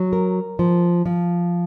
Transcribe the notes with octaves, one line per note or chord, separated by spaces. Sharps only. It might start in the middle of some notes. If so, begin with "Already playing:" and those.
Already playing: F#3
A#4
F3
F3